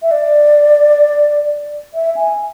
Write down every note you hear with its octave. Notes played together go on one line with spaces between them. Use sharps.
E5
D5
E5
G#5